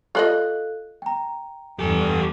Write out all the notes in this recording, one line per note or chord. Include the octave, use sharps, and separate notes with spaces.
F4 A4 D5 D#5 F5 F#6
G5 A#5
E2 G2 G4 A4